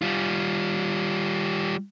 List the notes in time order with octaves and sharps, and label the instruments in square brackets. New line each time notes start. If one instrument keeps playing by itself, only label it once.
[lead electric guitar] G3 F4